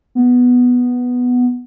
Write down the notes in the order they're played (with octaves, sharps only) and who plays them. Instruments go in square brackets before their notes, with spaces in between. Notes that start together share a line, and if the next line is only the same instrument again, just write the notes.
[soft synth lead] B3